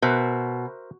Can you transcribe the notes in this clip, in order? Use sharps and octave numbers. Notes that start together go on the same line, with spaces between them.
B2 A#4 C5 E5